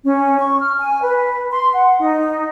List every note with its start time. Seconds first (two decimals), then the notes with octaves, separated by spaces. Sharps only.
0.04 C#4
0.38 C#6
0.59 F6
0.79 G#5
1.02 B4
1.52 C6
1.74 F#5
2.00 D#4